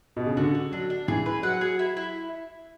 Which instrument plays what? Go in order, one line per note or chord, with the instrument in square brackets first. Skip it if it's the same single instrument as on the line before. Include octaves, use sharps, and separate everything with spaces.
[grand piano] B2
C#3
[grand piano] D3 [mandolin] F#4
[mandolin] F#4
[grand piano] F#3 [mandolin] D4
[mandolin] D4
[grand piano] E3 [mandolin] G#4
[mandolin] B4
[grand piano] F#3 [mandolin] F#5
[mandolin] G#4
E4
E4